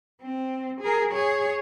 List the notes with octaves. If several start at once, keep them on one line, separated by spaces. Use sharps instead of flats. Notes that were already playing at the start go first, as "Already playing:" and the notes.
C4
G#4 A#4
G#4 C#5